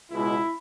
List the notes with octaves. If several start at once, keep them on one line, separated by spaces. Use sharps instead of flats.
C#2 B2 G#3 E4